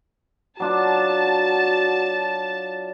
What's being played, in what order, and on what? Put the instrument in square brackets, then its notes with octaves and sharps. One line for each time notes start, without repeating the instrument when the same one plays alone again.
[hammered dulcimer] F#3 D4 F4 [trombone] F#4 [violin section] A5